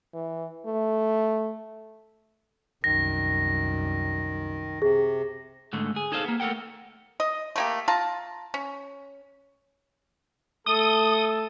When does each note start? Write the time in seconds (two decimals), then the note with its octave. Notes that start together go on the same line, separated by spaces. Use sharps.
0.14 E3
0.66 A3
2.84 C2 F#2 D#3 A#6
4.82 C3 G#4
5.73 G#2 D3 A3
5.96 G#4
6.12 D#4 G#4 A4 C5 D#5 F5
6.24 A#3 B3
6.40 A3 A4 A#4 F#5 G5
7.20 D#5
7.56 A3 A#3 G4
7.88 F4 A5 A#5
8.54 C#4
10.66 A3 A4 D#6